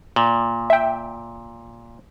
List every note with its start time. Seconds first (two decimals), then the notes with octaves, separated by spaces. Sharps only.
0.16 A#2
0.70 E5 G5